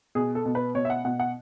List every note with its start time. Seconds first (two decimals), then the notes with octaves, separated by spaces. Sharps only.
0.15 B2 G#4
0.35 A4
0.46 B2
0.55 B4
0.75 B2 C#5
0.85 E5
0.90 F#5
1.05 B2 F#5
1.20 F#5